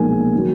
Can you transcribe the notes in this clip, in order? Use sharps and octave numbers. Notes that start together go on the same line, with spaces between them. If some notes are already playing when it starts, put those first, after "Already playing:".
Already playing: B1 A#2 F3 G#3 G#5
D#3 F#3